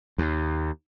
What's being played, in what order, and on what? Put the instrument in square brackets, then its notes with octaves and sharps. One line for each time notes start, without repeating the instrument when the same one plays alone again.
[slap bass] D#2